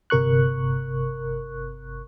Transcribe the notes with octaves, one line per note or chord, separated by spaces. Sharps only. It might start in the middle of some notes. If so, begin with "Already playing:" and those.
G1 C3 A#4 C#6 F#6